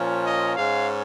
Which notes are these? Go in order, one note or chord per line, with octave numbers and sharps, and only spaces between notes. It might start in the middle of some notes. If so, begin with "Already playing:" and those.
Already playing: A#2 F3 C#4
D#5
G#2 G#3 C#4 F5